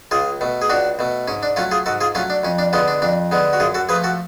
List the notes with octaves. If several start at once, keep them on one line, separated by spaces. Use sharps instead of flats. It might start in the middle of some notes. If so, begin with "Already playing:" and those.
C#2 F4 G#4
B2 A3
G#4
C#2 D4 F#4
B2 A3
G#2 C#4
D4
F#3 A3 C#4 F4
F4 G#4
G#2 F#4 A4
F4 G#4
F#3 A3 C#4 F4
D4
F2 C#4
D4
D3 G#3 B3 C#4 F4
D4
F2 D4
D3 G#3 B3
F#4
F#2 F4 G#4
F#4 A4
F3 A3 G#4 B4
F#4 A4